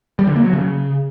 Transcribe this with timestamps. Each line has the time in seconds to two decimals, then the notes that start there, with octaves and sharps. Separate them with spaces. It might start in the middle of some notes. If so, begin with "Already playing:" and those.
0.19 G3
0.27 D3
0.36 A#3
0.44 F#3
0.53 C#3